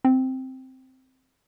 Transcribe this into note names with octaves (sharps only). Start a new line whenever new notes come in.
C4